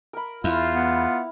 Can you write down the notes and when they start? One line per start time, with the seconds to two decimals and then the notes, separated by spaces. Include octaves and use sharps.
0.13 A#4 B5
0.44 E2 E4 F4 F5
0.75 B3